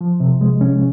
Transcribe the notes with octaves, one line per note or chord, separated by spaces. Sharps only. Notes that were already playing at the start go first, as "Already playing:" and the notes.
F3
C3
G#3
C#4